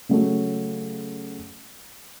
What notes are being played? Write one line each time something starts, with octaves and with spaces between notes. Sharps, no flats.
C#3 F#3 A3